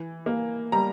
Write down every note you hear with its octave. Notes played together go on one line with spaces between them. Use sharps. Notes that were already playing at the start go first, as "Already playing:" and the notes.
Already playing: E3
A#3
G3 A#5